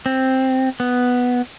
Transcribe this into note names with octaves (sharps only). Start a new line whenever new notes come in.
C4
B3